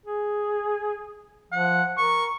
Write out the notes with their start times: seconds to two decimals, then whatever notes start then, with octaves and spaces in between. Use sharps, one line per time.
0.06 G#4
1.52 F3 F#5
1.98 A#4 C#6